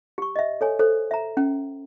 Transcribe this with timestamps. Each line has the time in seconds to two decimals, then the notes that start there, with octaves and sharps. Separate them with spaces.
0.18 G4 C#6
0.36 D#5 E5
0.61 A4 C#5 G#5
0.79 A4 C5
1.11 E5 A#5
1.37 C#4 G5